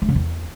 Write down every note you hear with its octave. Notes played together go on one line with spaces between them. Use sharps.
A3
C#3
E2